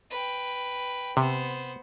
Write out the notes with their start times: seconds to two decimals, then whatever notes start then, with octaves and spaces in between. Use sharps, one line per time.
0.10 B4 G5
1.17 C3 B3 C5